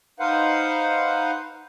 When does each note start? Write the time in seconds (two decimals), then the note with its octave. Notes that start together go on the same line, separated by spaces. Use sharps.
0.20 D#4 B4 C5 F5 F#5